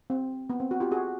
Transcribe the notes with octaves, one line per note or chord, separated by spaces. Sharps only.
C4
B3
C4
F#4
F4 G4
F#4 G#4